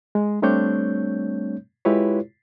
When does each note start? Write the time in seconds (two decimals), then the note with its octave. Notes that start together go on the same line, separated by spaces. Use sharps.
0.15 G#3
0.42 G3 A3 C4 D4 C#5 G6
1.85 G#3 E4 F4 G4 B4 C#5